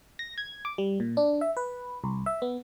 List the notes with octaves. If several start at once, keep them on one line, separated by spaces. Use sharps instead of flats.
A#6
G#6
D6
G3
A#2
D4
E5
B4
C2
E5
B3